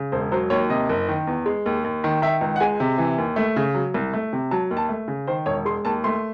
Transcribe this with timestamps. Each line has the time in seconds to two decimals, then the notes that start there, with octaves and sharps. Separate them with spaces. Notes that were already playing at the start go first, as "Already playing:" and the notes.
Already playing: C#3
0.12 E1 C5
0.32 F#3 C5
0.50 D#2 C#5
0.69 C3 D#5
0.89 F#1
1.09 D#3
1.27 E2
1.46 G#3
1.66 D#2
1.84 D#2
2.04 D#3
2.22 D#3 E5
2.41 C#2
2.56 F#5
2.60 G#3 G#5
2.80 C3
2.98 E3
3.18 D#2
3.36 A3
3.56 C#3
3.75 F#3
3.94 C2
4.14 A3
4.33 C3
4.51 F#3 A5
4.71 D#2
4.77 A5
4.89 A3
5.08 C#3
5.27 D#3 C5
5.46 E1 C#5
5.65 G#3 C6
5.85 D#2 A5
6.04 A3 C6